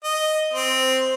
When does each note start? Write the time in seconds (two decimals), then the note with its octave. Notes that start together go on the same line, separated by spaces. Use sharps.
0.04 D#5
0.54 C4